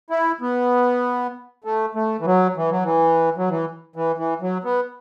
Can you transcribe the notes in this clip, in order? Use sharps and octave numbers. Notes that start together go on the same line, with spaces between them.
E4
B3
A3
A3
E3
F#3
E3
F#3
E3
F#3
E3
E3
E3
F#3
B3